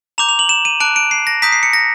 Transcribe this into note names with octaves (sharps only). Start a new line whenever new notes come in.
A#5 D6 G6 F7
F7
F#7
E7
D#7
A5 D6 F#6 D7
D7
C7
A#6
A#5 D#6 G6 B6
C7
C#7
A#6